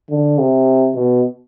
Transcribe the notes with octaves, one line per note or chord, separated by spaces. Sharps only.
D3
C3
B2